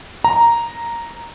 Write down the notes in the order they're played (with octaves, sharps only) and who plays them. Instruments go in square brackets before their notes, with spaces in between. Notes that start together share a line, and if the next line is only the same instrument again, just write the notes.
[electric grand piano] A#5